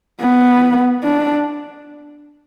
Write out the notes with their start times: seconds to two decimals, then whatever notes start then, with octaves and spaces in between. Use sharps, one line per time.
0.21 B3
1.03 D4